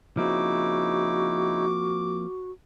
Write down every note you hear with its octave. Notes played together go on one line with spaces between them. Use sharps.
C#3 F3 A#3 C4 D#4 E4 F#4 D6